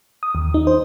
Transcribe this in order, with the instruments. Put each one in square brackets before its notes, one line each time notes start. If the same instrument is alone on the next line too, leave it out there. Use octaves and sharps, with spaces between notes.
[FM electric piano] D#6
D#2
D#4
C5